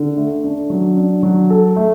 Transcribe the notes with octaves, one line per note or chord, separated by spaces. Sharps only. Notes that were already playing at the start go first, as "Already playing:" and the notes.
Already playing: D3
A3
D4
F#3
D4
F#3
A4
A3